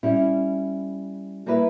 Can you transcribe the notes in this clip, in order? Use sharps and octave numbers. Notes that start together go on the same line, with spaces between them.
G3 C#4 E4
G3 A#3 E4 B4